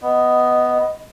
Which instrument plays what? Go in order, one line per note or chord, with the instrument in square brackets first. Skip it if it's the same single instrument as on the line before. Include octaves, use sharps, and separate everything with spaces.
[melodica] B3 [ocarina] D#5